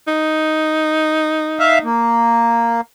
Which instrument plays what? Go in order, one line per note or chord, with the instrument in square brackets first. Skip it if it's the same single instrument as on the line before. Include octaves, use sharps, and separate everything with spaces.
[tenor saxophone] D#4
[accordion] E5 F5
A#3